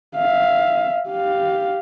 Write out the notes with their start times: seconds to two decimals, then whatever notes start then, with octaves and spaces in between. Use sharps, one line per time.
0.15 E5 F5
1.09 G4 F5